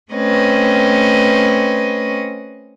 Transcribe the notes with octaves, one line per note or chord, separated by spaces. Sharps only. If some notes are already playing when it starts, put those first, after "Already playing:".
A3 C4 C#4 B4 D#5